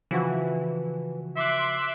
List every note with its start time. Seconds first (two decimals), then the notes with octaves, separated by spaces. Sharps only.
0.11 C#3 E3 F3 F#4
1.36 E5 C6 D6 F#6